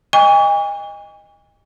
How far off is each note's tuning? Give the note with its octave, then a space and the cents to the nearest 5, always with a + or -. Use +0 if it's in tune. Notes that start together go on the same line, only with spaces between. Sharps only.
D#5 +0 G#5 -45 C#6 +40